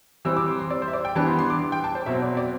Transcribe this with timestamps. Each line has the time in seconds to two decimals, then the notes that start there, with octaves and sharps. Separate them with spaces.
0.25 E3 G3 C4 E6
0.37 D6
0.48 C6
0.59 C6
0.70 D5
0.82 C5
0.88 E5
0.93 D5
1.05 G5
1.16 E3 G3 B3 D4 A5
1.27 C6
1.39 C6
1.50 D6
1.72 G5
1.84 A5
1.95 C5
2.06 B2 F#3 C4 E5
2.22 D5
2.37 D5